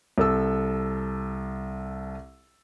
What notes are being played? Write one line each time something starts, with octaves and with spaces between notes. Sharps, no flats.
C2 A4 E6